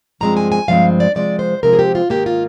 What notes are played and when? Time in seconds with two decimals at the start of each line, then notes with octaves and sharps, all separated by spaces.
0.21 G2 F3 G#3 C4 A#5
0.37 G#5
0.52 G#5
0.68 G2 F3 G#3 C4 F5
1.00 D5
1.15 C3 F3 G#3 C4 D5
1.39 C5
1.63 C3 F3 G#3 C4 A#4
1.73 G#4
1.79 G4
1.95 F4
2.09 G#2 D#3 A#3 G4
2.26 F4